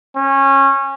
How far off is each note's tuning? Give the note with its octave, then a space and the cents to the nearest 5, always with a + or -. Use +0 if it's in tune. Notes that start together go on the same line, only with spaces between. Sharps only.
C#4 -20